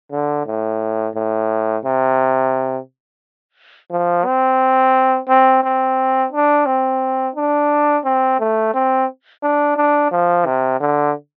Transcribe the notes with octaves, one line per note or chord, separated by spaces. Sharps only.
D3
A2
A2
C3
F3
C4
C4
C4
D4
C4
D4
C4
A3
C4
D4
D4
F3
C3
D3